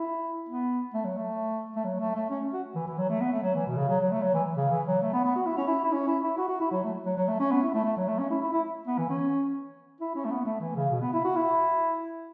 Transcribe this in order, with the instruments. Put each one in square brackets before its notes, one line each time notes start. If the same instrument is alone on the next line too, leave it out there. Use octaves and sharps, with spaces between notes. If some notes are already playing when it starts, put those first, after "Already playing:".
Already playing: [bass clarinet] E4
B3
A3
F#3
A3
A3
F#3
A3
A3
C#4
F#4
E3
E3
F#3
A3
B3
A3
F#3
E3
B2
C#3
F#3
F#3
A3
F#3
E3
C#3
E3
F#3
A3
B3
B3
F#4
E4
C#4
E4
E4
C#4
E4
E4
F#4
F#4
E4
F#3
A3
F#3
F#3
A3
C#4
B3
E4
A3
A3
F#3
A3
C#4
E4
E4
E4
B3
E3
C#4
E4
C#4
A3
B3
A3
E3
C#3
B2
B3
E4
F#4
E4